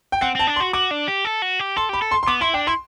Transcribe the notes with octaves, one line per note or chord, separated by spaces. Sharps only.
G5
C4 F#5
C4 A5
D4
C6
F#4
F#4 D6
D4
G4
A4
F#4
G4
A4 C6
G4 B5
A4
C6
C6
B3 D6
E4 C6
D4 G5
E4 C6